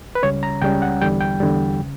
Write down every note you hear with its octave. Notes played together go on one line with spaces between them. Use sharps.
B4
C#2 C#3 G3 C#4 C#5
A#5
C#2 C#3 G3 C#4 G5
F#5
E2 D3 G3 G5
G5
E2 D3 G3
C#3